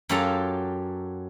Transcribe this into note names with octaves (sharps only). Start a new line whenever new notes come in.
F#2 F#3 F4 G4 A4 A#5